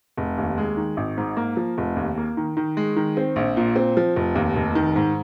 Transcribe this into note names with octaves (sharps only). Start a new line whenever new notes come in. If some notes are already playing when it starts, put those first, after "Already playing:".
F1
D#2
G#3
D#3
G#1
G#2
A#3
F3
F1
D#2
A#3
D#3
D#3
G#3
D#3
C4
A#1
A#2
C4
F3
F1
D#2
F1
D#3
G#2